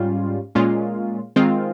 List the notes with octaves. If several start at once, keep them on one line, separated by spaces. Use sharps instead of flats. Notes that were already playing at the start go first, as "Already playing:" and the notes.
Already playing: G#2 G3 C#4 F4
A#2 G#3 C#4 F4
D#3 G#3 C4 F4